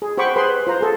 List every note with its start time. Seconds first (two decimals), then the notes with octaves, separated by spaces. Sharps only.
0.02 G#4
0.18 G4 C5 F#5 B5 C#6 D6
0.36 G#4 B4 C5 B5 C6
0.67 F4 C5 A#5
0.81 G#4 A4